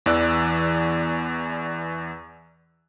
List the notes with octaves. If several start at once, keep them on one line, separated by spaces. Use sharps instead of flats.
E2 E3 D5 E6 F#6